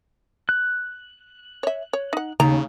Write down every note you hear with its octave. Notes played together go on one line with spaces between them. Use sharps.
F#6
C#5 E5
C#5
D#4 F#5
D#2 C#3 A#5